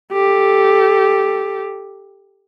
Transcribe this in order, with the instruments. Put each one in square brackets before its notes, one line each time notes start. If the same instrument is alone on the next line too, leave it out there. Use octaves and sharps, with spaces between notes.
[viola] G4 A4